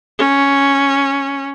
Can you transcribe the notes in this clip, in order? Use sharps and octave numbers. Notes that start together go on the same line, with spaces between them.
C#4